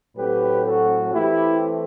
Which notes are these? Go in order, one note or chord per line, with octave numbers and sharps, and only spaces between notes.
A2 F#3 A3 C4 G4 B4
F#4 A4
E3 A3 C4 E4 G4